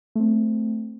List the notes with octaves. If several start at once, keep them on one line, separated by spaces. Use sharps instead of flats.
A3 C4